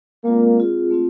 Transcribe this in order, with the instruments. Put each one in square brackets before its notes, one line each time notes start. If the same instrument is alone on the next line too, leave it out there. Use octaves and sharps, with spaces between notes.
[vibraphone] G#3 C4 F4 A#4 D5 [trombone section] A#3
[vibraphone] C4 F4 G#4
A3 C4 F4